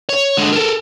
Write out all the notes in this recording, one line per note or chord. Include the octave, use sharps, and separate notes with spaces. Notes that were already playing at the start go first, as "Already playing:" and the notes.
C#5
D3 G#3
A4 A#4